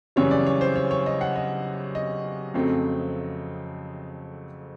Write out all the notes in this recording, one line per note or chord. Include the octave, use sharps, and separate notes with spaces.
F#2 C#3 E3 G3 C#5
D5
C#5
C5
C#5
C#5
D#5
F#5
D#5
D#5
F2 C#3 F#3 A3 C4